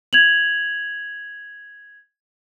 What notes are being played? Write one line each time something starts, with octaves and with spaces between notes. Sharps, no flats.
G#6 F7 F#7